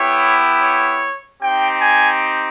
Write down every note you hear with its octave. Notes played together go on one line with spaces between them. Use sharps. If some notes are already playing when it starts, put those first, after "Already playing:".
Already playing: B3 E4 G4 C#5
C#5
C4 D#4 G4 G5
G#5